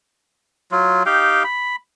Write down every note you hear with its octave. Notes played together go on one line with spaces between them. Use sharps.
F#3 F4
D#4 G4 F5 G5
B5